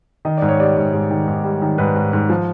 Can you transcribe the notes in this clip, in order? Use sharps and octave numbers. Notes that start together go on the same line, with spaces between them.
D#3 D#5
G#2 D5
C#5
G3 D5
G#2
G#2
D#3
G#2
G3
D#3
G#2 B4
G#2
G#2
F3